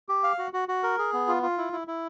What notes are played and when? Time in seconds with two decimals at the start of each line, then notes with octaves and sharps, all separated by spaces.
0.09 G4
0.24 F5
0.38 F#4
0.53 F#4
0.68 F#4
0.83 A#4
0.98 G#4
1.13 B3
1.28 F4
1.43 F4
1.58 E4
1.73 E4
1.88 E4